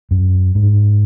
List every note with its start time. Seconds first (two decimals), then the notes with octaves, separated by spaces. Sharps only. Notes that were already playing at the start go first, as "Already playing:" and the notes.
0.11 F#2
0.55 G#2